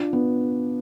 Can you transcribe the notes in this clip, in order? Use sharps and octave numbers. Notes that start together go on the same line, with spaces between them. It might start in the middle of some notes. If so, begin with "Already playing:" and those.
Already playing: D4 F4
B3